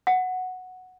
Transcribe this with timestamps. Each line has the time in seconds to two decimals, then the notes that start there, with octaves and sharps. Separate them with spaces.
0.07 F#5